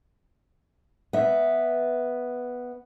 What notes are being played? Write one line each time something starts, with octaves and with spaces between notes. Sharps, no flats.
B3 E5